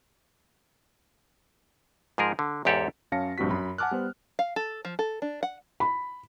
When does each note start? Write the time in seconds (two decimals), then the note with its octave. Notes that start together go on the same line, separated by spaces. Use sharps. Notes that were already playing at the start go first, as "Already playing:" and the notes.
2.18 G#2 F3 G#4 A#4
2.39 D3
2.65 E2 G#2 G4 A4 C#5 F#5
3.12 F#2 C#4 F5 A5 A#6 C#7
3.38 A#1 G2 C4 F#4 B6
3.50 F#2 B5 B6
3.78 F#5 G#5 A5 D6 F6 F#6
3.91 G3 B3 C5
4.39 F5
4.56 A4
4.85 F3
4.99 A4
5.22 D4
5.43 F#5
5.80 B5